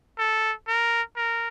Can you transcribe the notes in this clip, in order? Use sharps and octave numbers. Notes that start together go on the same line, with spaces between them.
A4
A#4
A#4